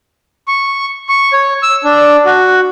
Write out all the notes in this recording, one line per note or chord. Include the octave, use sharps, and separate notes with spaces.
C#6
C#6
C#5
E6
D4
F#4